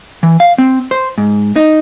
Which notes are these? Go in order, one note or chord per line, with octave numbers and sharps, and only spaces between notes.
E3
F5
C4
C5
G#2
D#4